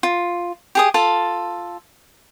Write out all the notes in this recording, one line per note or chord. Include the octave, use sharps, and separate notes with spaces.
F4
G4 G#4 D#6
F4 A4 A5